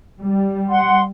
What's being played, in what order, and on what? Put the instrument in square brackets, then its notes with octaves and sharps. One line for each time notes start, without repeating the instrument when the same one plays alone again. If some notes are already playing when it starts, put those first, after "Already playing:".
[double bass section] G3
[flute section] F#5 C6